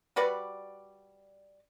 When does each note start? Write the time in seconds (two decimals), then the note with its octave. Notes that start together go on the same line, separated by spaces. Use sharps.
0.16 G3 F#4 B4 D5